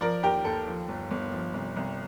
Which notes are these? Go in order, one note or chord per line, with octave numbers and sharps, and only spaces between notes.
F3 A#4 D5
D#2 G4 A#4
D#2 A4
F3
G1
G1
F3
C2
C2